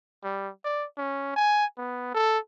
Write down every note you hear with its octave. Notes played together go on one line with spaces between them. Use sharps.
G3
D5
C#4
G#5
B3
A4